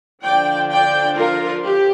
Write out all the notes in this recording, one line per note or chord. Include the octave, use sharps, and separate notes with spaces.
D3 F3 D4 D5 G5
D5 G5
F4 A#4
G4